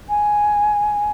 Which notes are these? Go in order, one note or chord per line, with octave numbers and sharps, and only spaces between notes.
G#5